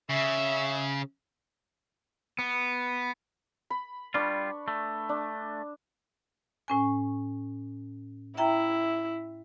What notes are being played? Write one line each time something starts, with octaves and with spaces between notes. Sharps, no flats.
C#3 E5
B3
B5
G3 D4 F4 B4 C#6
A3
D4
A2 C#4 G#5
E4 E5 G5 A#5